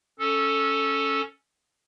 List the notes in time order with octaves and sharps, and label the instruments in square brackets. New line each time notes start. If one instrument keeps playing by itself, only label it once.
[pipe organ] C#4 A4